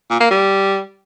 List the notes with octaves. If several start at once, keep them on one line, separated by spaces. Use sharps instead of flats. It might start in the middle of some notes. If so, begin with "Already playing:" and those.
A#2
A#3
G3